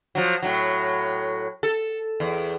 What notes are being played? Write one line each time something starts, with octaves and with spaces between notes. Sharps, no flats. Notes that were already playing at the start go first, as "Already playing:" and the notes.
F3 F#3
A2 F#3
A4
E2